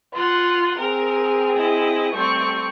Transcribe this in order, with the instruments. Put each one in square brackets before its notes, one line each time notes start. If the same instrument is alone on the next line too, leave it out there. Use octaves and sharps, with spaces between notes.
[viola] F4 F#5 [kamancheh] C6
[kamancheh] C4 G#4 [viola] A#4
[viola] E4 D#5
[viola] G3 C4 [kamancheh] A3 C#6